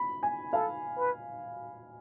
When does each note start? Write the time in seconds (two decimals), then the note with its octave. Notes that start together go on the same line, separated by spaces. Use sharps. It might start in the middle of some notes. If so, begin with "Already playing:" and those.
Already playing: B5
0.23 G#5
0.53 A4 F5
0.97 B4